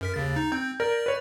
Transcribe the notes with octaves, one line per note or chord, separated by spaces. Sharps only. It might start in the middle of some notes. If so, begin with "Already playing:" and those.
F#2 A#4 B6
D#2 C#3 A6
D#4
C4 G6
A#4 D5
B4 C#5